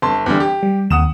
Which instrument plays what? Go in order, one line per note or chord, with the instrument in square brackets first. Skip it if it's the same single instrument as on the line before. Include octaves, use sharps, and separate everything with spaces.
[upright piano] G1 A5 C6
E2 D3 G3
G4
[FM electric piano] G3
[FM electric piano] D#2 [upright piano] F#5 D#6 E7